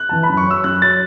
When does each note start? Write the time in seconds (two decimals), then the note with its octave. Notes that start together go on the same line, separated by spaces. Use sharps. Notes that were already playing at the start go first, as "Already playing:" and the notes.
Already playing: F#6
0.09 E3 A5
0.23 B5
0.29 F#2
0.37 C#6
0.46 F#3 E6
0.64 F#2 F#6
0.82 F#3 A6